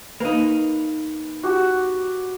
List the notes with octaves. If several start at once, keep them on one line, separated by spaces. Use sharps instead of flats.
A#3 D#4 B4
F#4 G4